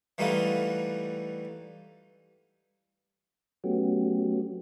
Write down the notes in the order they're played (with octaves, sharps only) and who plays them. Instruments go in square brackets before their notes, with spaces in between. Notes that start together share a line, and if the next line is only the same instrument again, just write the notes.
[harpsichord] E3 G3 A3 D#4 F4 F#4
[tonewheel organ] F#3 A3 B3 C#4 F#4 G4